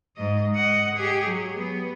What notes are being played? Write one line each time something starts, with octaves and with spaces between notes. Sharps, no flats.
G#2 D#5
D#5 F#5
G4 G#4
F#3
B3